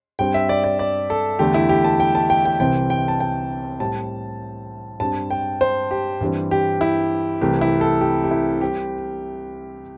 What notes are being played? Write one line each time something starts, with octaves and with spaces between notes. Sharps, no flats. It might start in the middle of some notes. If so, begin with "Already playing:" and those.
G2 G3 C4 G5
E5
D5
D5
D5
A4
E2 D3 A3 G4
E4
G4
A5
G5
A5
G5
G5
C2 C3 E3 C4 G5
G5
A5
G5
A2 G3 C4 A5
G2 G3 C4 A5
G5
C5
G4
G2 E3 G3 C4
G4
E4
C2 C3 E3 A3 G4
E4
A4
G4
G4
E4
G3 C4 G4